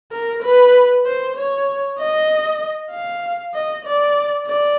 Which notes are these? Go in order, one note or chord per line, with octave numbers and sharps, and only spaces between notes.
A#4
B4
C5
C#5
D#5
F5
D#5
D5
D5